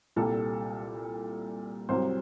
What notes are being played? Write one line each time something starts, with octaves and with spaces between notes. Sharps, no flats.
C2 A#2 G3 A4
C2 C3 F#3 C5